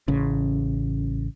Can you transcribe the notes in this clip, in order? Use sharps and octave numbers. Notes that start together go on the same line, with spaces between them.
A1 C#3